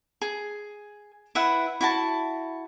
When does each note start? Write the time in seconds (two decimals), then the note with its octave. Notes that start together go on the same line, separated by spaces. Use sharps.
0.22 G#4
1.35 E4 B4 E5 F#5
1.81 E4 F#4 A5